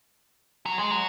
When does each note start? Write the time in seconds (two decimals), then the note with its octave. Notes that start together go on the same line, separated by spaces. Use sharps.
0.66 F#3
0.79 G#3
0.91 F#3